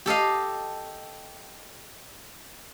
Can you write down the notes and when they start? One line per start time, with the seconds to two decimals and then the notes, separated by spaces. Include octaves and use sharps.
0.06 G4 A4 D#5 F5